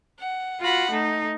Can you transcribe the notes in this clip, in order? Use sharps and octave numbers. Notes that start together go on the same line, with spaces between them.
F#5
F4 F#4 F#5 B5
A3 D#4